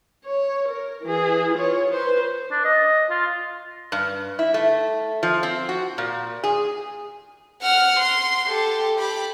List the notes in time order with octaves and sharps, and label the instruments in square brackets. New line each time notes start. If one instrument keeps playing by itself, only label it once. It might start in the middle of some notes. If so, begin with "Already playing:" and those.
[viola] C#5
A#4
E3 G#4
F4 C#5
B4 C5
[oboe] D4
D#5
F4
[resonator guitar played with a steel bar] G2
E4
A3
F3
C4
F#4
A#2
G#4
[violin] F#5 F6
C6
G4 A4
G4 B5